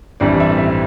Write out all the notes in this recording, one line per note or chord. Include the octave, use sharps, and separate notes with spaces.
A1 G2 E3 G3 C4 D5
E5
E5